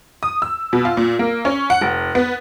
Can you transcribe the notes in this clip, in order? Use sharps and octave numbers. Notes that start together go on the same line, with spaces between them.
D#6
E6
B2
F4
A#2
A#3
C#4
F#5
F1
B3